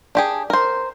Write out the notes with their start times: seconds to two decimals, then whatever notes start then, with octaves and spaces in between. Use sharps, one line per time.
0.15 D4 G4 G#4
0.50 A#4 C5